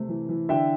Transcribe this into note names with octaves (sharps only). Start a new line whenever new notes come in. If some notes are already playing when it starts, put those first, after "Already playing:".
Already playing: C3 A3 C4
E3
E3
D3 E5 G5